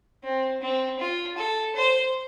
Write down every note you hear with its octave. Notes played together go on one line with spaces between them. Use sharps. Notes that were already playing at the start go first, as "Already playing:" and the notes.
C4
C4
F4
A4
C5